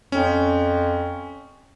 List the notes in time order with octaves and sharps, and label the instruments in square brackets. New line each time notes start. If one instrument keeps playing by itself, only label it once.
[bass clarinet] F2 [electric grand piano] C#4